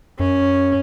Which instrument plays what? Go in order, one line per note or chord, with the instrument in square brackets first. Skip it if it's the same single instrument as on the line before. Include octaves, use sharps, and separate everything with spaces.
[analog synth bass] F#2 [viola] C#4